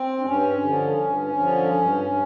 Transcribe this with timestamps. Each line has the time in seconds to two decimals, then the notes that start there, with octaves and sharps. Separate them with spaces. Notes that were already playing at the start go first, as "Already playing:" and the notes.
Already playing: C4
0.19 D4
0.24 G2 C#4
0.62 D3 F3
1.01 G2
1.38 D3 F3
1.77 G2